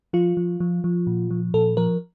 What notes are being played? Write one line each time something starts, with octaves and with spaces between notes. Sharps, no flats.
F3 F4
F3
F3
F3
A#2
F3
A#2 A4
F3 A#4